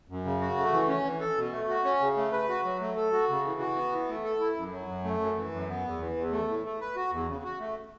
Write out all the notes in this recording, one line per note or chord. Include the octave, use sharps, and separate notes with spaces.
F#2
C#3
F#4
A3
E3
C#4
E3
A4
B2
A3
F#4
C#4
C#3
A3
B4
F#4
F#3
A3
A4
F#4
C#3
E3
F#4
B3
E3
A3
A4
E4
F#2
F#3
F#2
A3
F#2
E3
F#2
B3
E2
E3
E2
A3
A2
A3
B4
F#4
E2
C#3
F#4
A3